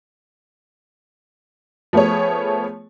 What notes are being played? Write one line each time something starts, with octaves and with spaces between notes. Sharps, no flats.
F3 A3 B3 G#4 C#5